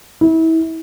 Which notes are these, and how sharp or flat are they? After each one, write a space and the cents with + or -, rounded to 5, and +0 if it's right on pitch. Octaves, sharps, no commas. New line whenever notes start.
E4 -30